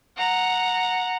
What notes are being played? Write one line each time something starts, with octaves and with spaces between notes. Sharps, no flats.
F#5 A#5